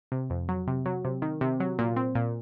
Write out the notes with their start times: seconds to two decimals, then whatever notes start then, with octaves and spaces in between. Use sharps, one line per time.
0.12 C3
0.30 F2
0.49 F#3
0.67 C3
0.86 F#3
1.05 C3
1.22 D#3
1.41 C3
1.60 F#3
1.79 A#2
1.96 C4
2.15 A#2